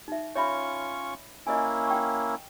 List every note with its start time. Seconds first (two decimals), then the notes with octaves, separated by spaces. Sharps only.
0.08 D#4 E5
0.36 C#4 F4 C#5 E5 B5 C#6
1.47 A#3 C#4 E4 D#5 G#5
1.87 G5 C#6